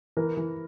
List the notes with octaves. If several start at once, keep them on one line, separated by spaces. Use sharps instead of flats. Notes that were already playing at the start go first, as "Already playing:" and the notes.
E3 A#4
E3